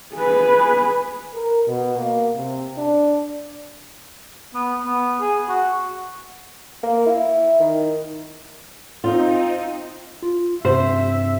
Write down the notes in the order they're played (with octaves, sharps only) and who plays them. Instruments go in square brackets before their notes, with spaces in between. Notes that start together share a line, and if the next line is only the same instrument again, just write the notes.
[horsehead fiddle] G#4 B4
[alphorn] A#4
B2
A#3
C3
D4
[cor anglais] B3
B3
G#4
F#4
[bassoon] A#3
E4
D#3
[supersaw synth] C4 D#4 [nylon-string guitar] F4
[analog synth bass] F4
[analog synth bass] G2 [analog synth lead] C3 [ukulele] C5 [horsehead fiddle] E5